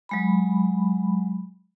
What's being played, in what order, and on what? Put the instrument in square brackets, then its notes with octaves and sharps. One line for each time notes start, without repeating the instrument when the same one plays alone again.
[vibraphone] F#3 G#3 B5